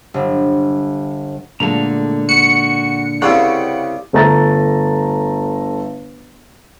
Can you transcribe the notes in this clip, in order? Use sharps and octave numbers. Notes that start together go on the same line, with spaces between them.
G1
A#2 D3 G#3 A3 A#5
F#4 C#7
C2 C#3 F#5 G5 E6
G1 A3 A#5 A6